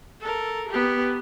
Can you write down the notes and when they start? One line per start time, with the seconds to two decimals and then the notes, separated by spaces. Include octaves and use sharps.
0.21 A4 A#4
0.69 B3 G4